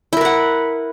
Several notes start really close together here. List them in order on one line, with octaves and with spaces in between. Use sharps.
E4 A#4 B4 F#5